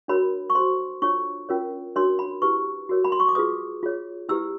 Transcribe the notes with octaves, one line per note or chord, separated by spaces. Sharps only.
D4 F#4 A#4 C#5 B5
C#6
F#4 A4 C5 C6
D4 F4 A4 C#5 C#6
C#4 F4 A#4 C#5
D4 F#4 A#4 C#5 C6
B5
E4 G4 B4 C#6
F#4 A#4 C#5
B5
C6
C#6
D6
F4 G#4 B4 D#6
F4 G#4 C#5
E4 G4 B4 E6